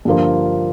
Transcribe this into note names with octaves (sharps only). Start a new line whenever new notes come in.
G2 D3 F3 A#3 F4